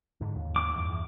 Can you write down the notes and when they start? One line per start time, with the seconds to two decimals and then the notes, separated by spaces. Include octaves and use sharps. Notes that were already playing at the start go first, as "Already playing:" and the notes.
0.21 G#2 D3
0.35 D#2
0.56 D6
0.76 E2 G2
0.89 E2